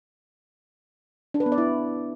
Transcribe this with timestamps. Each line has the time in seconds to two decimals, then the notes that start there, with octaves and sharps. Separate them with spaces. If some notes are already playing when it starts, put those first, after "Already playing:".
1.34 D4
1.40 B4
1.46 B3
1.52 D5
1.58 E4